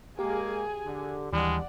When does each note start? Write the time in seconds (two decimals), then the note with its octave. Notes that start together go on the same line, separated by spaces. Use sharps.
0.19 G#3 A#3 G4 G#4 G#5
0.85 D3
1.33 D#2 E3 G3 G#3 D4 D5 F#5